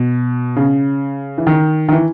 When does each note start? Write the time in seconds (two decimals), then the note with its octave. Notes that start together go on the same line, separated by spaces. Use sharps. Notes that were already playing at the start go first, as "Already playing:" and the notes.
Already playing: B2
0.56 C#3
1.38 E3
1.47 D#3
1.88 D#3
1.92 E3